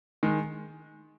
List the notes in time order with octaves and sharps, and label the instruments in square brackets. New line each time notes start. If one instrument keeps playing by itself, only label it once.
[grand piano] D#3 G#3